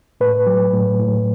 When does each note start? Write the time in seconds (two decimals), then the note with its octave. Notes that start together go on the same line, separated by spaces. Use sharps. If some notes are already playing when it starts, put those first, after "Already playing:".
0.21 A2 B4
0.47 F#3
0.73 A2
0.99 A2